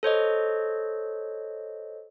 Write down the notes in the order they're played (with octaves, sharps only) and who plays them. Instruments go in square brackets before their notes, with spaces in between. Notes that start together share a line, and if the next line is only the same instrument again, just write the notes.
[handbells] A4 C5 C#5 D#5